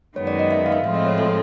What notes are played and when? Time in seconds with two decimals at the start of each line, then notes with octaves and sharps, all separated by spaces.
0.16 F#2 D#3 G#3 B3 C#5
0.27 D5
0.39 D#5
0.51 E5
0.66 F5
0.72 E5
0.84 A2 F3 G#3 C4 F4 E5
0.95 D#5
1.07 C#5
1.18 A4